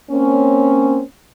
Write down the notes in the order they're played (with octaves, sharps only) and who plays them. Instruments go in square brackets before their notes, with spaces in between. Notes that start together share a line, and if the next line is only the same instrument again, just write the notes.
[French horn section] A#3 C4 C#4